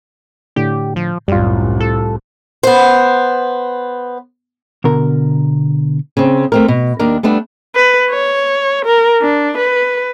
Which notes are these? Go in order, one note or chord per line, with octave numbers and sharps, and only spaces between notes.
A2 D3 G4
F3
C2 F#2 A2 G3 F4
A4
B3 C5
B2 D3 A#4
C#3 C4
A3 C4 A#4
B2
D#2 D4 A#4
G3 A3 B3 D4
B4
C#5
A#4
D4
B4